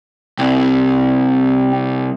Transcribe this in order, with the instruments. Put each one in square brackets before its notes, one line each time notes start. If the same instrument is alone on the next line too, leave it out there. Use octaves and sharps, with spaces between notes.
[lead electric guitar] C2 [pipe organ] C4